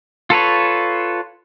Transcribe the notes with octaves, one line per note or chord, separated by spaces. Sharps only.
F4 A4 B4 C#5